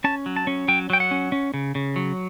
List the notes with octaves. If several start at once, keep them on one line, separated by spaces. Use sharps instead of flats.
C#4 A5
F#3
A5
C#4
F#3 G5
F#3 G5
F#5
C#4
C#4
C#3
C#3
F#3